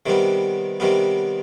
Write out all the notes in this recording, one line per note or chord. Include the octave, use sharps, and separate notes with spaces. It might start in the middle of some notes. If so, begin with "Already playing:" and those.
C3 D#3 G3 B3
C3 D#3 G3 B3